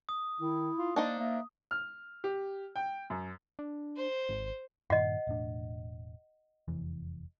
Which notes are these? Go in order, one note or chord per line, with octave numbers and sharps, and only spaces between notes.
D#6
D#3 E4
F4
A#3 D4 D#4 C5
A#3 E5
F6
G4
G5
F#2
D4
C5
G#1
G2 A#2 D#3 D#5 F#5
E1 A2 D4
F1 E2 E3